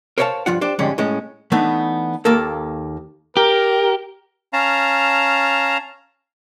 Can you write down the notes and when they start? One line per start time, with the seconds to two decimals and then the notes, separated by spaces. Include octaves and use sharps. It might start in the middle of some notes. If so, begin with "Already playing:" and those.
0.18 A#4 C5 C#5 E5 F5 A5
0.46 G2 F3 F4 F#5
0.61 D4 G4 C5
0.79 F2 G#2 D3 G3 G#3 C#4
0.98 A2 G#3 C#4
1.52 E3 A3 B3 D4 D#4
2.25 D#2 A#3 A4 A#4
3.37 G4 A#4
4.53 C#4 F5 A5 A#5